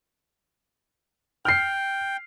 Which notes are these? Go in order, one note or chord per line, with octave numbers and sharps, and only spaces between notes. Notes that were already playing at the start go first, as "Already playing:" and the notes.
G5 F6 C7